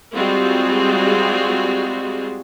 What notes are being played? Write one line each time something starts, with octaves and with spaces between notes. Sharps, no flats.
G3 G#3 C4 F4 F#4 G#4